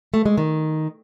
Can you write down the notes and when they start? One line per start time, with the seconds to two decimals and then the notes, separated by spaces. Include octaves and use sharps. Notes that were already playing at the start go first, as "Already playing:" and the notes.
0.14 A3
0.26 G#3
0.37 D#3